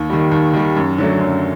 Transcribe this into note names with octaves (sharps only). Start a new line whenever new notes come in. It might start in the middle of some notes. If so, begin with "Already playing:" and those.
Already playing: D#2
D#3 G3
D#2
D#3 G3
F#2
D3 F#3 A3
F#2